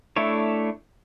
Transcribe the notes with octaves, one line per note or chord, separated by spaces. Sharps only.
A3 D4 E4 A4 C#5